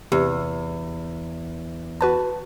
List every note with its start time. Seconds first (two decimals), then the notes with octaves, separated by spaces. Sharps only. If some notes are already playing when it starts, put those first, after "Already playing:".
0.12 E2 C3
2.01 F#4 B4 A5